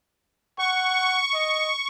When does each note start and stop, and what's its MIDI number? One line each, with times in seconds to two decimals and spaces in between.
0.59 1.20 78
0.59 1.88 85
1.34 1.71 75